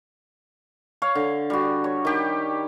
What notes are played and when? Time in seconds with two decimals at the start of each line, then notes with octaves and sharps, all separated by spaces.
1.02 C#5 F5
1.15 D3
1.50 G3 F#4
1.84 C#5
2.05 D#3 G4